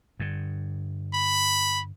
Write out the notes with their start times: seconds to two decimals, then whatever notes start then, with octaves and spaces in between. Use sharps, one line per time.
0.20 G2 D3
1.14 B5